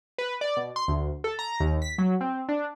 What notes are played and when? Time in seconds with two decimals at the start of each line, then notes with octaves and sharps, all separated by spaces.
0.18 B4
0.41 D5
0.57 B2
0.76 C6
0.88 D2
1.24 A4
1.39 A#5
1.60 D#2
1.82 B6
1.98 F#3
2.21 C4
2.49 D4